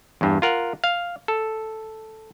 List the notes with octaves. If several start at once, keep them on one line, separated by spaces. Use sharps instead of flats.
E2 G2
F4 A#4 F#5
F5
A4